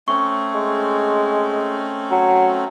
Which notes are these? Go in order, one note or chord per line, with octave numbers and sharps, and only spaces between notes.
A3 C4 C#4 C#6
G#3
F#3